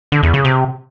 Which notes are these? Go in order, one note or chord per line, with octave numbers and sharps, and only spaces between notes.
D3
E2
C#3
C3